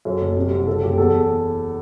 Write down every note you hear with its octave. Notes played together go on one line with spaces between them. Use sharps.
F#2 A4
F#1
C3
C2
F#2 A4
F#1 G4
E2 A4